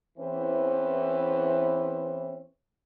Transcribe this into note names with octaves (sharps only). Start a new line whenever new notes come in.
E2 E3 C4 C#4 B4 C5